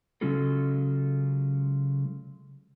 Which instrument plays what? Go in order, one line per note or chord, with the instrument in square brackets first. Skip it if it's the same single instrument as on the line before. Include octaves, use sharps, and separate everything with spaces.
[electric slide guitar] C#3 F#3 G#3 C#4 F4 A4